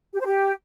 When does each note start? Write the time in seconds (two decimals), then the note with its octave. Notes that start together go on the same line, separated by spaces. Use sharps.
0.13 G4
0.20 C5
0.26 G4